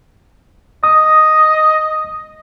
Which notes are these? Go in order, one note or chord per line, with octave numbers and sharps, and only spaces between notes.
D#5 D#6